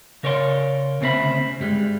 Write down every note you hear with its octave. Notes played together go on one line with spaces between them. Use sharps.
C#3 A#4 C#5 D5 E5 C6
D2 C#3 C4 E4 E5 B5
G2 G3 G#3